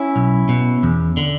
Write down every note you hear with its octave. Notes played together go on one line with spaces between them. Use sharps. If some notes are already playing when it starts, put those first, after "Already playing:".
Already playing: C#4 E4
B1
B2
E2
D3